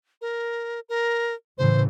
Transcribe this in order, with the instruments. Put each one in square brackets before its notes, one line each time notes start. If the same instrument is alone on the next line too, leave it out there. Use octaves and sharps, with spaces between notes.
[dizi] A#4
A#4
[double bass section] A2 C#3 E3 [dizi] C5